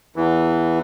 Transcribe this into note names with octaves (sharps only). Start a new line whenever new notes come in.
E2 E3